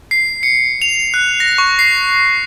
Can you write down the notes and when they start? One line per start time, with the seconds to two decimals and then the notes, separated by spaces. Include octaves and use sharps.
0.11 C7
0.43 C#7
0.82 F7
1.14 F#6
1.40 A#6
1.58 C#6
1.79 C7